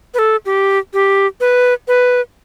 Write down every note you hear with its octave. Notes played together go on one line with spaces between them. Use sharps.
B4
A4
G4
G4
B4
B4